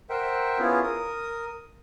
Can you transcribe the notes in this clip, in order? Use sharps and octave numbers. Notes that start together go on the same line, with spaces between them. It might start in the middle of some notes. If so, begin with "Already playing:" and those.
A#4 C5 E5 F#5 G5
B3 C#4 E4 F4 G#4
A#4 D#6